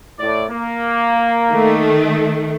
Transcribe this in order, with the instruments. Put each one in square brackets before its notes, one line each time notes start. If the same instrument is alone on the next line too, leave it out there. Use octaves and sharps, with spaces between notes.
[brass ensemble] A2 D5
A#3
[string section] D#3 A3